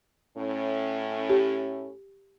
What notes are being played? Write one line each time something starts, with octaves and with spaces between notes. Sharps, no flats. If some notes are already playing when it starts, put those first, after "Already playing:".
A2 C#4
G4